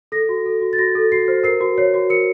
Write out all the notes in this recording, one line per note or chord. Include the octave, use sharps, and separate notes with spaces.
A4 A#6
F#4
A4
F#4
A6
F#4 A#6
A4
F#4 C7
C5
A#4 C7
F#4
C#5 C7
F#4
A#4 C#7